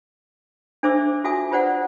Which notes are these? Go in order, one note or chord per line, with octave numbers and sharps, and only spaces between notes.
D4 A4 C5 E5 D6 E6
F4 F#4 A4 E5 G#5 D#6
F4 G4 B4 C5 D5 F#5